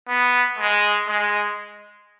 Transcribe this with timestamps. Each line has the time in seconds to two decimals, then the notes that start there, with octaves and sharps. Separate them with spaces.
0.08 B3
0.58 G#3
1.08 G#3